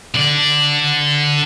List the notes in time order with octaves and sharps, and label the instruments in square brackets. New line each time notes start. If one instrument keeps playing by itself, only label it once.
[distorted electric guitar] D3 D5